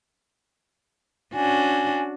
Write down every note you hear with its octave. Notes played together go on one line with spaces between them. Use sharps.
C#4 D4 F#4 G#5